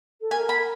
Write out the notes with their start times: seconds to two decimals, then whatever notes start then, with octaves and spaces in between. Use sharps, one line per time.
0.21 A4
0.31 A#4 G#5
0.49 B5
0.58 A#4